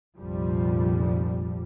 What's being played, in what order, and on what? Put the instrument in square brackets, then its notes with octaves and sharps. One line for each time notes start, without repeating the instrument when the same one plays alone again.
[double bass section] F1 A#1 F2 A#2 F3 G3